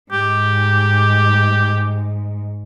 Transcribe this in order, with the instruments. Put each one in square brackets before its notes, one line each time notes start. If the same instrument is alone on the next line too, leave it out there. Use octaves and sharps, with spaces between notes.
[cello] G#2 [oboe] G4